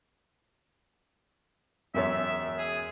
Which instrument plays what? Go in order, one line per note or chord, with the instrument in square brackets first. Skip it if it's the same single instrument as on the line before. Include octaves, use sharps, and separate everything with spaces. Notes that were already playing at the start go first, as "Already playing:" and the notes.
[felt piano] E1 F#2 C#5 [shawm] E5
[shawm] G#4